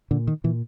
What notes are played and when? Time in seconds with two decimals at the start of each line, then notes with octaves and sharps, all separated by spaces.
0.11 A#2 D3
0.27 D#3
0.44 A#2 E3